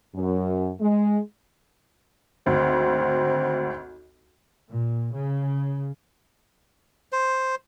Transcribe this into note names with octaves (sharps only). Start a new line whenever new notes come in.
F#2
G#3
G#1 D2 C4
A#2
C#3
C5